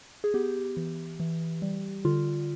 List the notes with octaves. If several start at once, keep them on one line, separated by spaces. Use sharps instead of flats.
G#4
B3 G4
E3
E3
G3
D3 F4